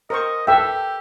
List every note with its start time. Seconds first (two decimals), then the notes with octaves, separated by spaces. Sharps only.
0.10 A#4 C5 D#5 C#6
0.47 G4 A4 B4 E5 G5 E6